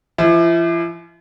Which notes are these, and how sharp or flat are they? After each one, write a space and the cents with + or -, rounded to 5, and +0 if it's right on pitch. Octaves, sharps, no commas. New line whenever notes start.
F3 -45 E4 -20